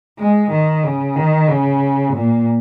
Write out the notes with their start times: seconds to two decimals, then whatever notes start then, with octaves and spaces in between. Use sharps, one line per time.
0.19 G#3
0.52 D#3
0.84 C#3
1.16 D#3
1.48 C#3
2.14 A#2